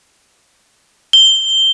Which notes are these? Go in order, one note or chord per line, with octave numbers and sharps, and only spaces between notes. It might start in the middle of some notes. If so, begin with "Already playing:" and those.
G7